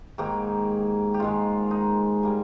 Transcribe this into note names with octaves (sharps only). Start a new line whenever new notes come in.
G#2 D#3 A#3 G4
G4
G#2 D#3 G#3 F4
D#4
G3 A#3